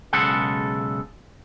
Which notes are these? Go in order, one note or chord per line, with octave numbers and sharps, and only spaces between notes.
B1 C#3 G#3 A4 F#5